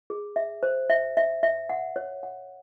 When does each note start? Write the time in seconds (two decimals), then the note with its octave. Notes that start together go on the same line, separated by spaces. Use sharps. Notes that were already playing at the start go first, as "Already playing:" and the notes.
0.10 G#4
0.36 E5
0.63 C5
0.90 E5
1.17 E5
1.43 E5
1.70 F#5
1.96 C#5
2.23 F#5